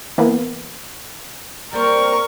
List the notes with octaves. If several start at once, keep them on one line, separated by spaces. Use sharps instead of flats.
E3 A#3 B3
G3 A#3 C4 A#4 C#6